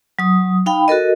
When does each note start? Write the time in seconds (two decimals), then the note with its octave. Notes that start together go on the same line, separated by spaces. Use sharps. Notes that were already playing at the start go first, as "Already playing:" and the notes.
0.19 F#3 D#6
0.66 D#4 F5 G5 B5
0.88 F#4 A4 A#4 D#5